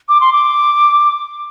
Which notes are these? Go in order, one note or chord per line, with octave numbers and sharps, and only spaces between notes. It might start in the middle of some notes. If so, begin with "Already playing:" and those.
D6
C6
D6